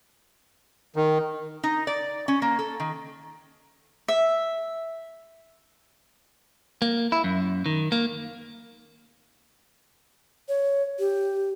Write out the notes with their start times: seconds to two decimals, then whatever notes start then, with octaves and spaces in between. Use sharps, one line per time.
0.96 D#3
1.63 D#4
1.87 D5
2.28 C#4
2.42 A#3
2.59 A4
2.80 D#3
4.08 E5
6.82 A#3
7.12 E4
7.24 F#2
7.66 D#3
7.92 A#3
10.49 C#5
10.99 G4